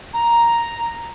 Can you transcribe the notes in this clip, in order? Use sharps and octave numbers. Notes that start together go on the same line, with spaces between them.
A#5